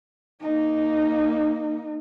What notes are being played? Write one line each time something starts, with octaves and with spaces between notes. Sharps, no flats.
A#3 D#4